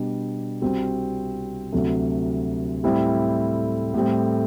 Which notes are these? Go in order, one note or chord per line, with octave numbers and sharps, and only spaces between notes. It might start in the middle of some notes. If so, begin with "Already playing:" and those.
Already playing: B2 G3 D4
C2 C3 G3 C4 F#4
D2 C3 F#3
A2 G3 C4 E4
A2 G3 C4